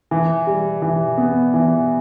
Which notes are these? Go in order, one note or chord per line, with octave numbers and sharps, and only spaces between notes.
E3
G3
E3
B3
E3